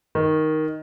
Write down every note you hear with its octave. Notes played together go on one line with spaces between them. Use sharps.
D#3